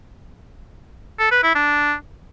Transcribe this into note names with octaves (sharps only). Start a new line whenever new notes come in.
A4
B4
E4
D4